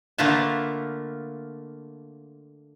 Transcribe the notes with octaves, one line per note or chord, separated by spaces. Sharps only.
D3 A3 A#3 F4 B4 A5